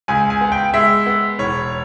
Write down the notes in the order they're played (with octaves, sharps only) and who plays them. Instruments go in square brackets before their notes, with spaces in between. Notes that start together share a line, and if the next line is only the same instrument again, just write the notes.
[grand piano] C#2 G#5
G#5
B3
G5
G#3 E5
B3
E1 C#5